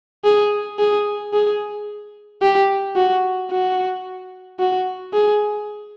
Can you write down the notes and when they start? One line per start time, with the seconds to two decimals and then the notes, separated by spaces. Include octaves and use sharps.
0.24 G#4
0.79 G#4
1.33 G#4
2.42 G4
2.96 F#4
3.51 F#4
4.60 F#4
5.13 G#4